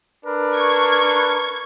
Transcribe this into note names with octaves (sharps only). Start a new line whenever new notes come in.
D4 A#4 B4
C#6 G#6